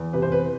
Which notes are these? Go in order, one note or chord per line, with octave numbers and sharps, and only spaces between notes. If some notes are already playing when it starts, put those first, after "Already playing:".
Already playing: E2
C3 B4
C5
B4